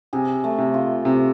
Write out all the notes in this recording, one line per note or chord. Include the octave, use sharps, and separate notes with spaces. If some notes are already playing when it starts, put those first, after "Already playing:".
C3 G#4
A3
C3
F4
C3